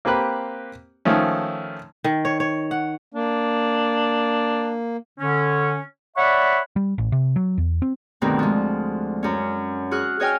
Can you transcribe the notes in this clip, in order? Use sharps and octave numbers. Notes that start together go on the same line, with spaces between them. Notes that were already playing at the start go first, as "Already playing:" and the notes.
A#3 C4 G4 B4 F#6
D#3 F3 A3 C#4
D#3
C#5
C#5
F#5
A#3 D4
D3 C#4
C#5 D5 E5 F#5 B5 C#6
G3
A1
C3
F#3
E2
C4
D2 G2 B2 D#3 C4
F3 G#3
F#2 C#4
F#4 G#4 F6 F#6
G#4 C#5 D#5 G5 G#5 F6